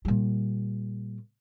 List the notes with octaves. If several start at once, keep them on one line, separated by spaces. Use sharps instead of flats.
A#2 G3